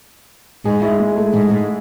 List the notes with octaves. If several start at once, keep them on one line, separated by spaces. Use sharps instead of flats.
G#2 G#4
E4
G#3
A3
G#2